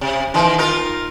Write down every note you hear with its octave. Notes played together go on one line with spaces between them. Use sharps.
C3
D#3 E3
D#4 F4 A#4